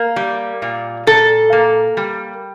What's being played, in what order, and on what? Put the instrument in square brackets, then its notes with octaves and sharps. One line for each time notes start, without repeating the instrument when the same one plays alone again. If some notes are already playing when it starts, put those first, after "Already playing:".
Already playing: [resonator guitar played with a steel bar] A#3
G3
A#2
A#2 A4
A#3
G3